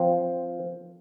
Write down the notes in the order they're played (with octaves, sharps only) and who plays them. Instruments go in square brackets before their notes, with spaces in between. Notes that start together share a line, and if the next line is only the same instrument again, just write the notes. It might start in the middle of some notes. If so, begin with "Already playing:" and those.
Already playing: [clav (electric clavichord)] F3 C4